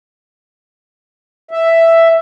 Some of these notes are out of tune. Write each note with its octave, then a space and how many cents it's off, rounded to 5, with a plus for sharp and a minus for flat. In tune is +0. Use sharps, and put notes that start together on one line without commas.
E5 +5